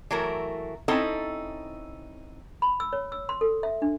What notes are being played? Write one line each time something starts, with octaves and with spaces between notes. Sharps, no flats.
E3 F#3 A3 E4 A#4
C4 C#4 D#4 E4 A4
B5
E6
C#5
E6
C6
A4
E5
D4